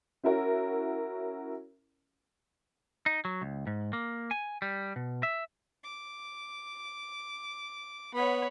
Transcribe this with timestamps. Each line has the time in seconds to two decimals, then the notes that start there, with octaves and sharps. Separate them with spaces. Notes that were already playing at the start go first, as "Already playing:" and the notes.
0.23 C#4 E4 F#4 A#4
3.06 D#4
3.25 F#3
3.42 C#2
3.67 G#2
3.93 A#3
4.31 G#5
4.62 G3
4.96 B2
5.23 E5
5.84 D6
8.15 B3 C#5 F#5 B5